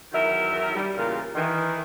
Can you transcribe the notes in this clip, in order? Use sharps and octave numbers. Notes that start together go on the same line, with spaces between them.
E2 D#3 F#3 A#4 E5
G3
E2 A#2 C#3 F4 G4 A#4
D#3 E3